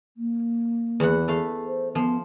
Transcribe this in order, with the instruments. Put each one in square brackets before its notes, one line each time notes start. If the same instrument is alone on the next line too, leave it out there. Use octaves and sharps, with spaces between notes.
[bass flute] A#3
[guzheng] E2 F#5
A3 F5
[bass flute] C5
[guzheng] F3 [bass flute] B3